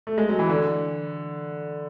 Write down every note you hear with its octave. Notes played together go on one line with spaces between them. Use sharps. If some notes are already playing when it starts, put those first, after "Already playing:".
A3
G#3
F#3
E3
D3